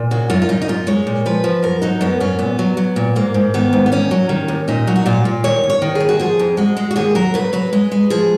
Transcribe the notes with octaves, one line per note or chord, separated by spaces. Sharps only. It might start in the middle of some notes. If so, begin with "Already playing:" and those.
Already playing: A#2
C#3 F#4
F#2 F4
F4
F#2 D#4
D#4
F#2 F4
G#3 C#5
A#2
F3 B4
F3
F#2 A#4
F#3 D#4
F#2 B3
F#2 C#4
A#2 B3
F#3
F#3
A#2
G#2 A#3
G#2
D#3 B3
G#2
B3
D#2 C#4
F#3
D#3
D#2
A#2 D#4
F#3
F#4
A#2 F4
A#2
D#2 C#5
D#2
C#5
D#3
G#4
D#2
F#4
F3 G#4
F2
G#3 F#4
G#3
F#4
D#2 G#4
F#3 A#4
C#3 B4
F#3 B4
G#3 B4
G#3
F3 G#4